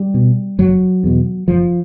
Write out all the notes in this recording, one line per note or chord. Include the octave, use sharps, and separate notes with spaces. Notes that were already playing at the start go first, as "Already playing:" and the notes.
Already playing: G3
B2
F#1 F#3
E2 B2
F#1 F3